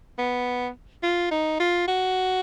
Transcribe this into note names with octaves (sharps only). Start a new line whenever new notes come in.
B3
F4
D#4
F4
F#4